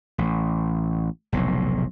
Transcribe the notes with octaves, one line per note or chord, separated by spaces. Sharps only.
A1
F1 B1 A2